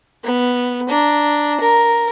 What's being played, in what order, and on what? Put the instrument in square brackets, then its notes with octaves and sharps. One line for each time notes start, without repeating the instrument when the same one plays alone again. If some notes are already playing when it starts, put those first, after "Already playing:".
[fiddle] B3
D4 A#5
A#4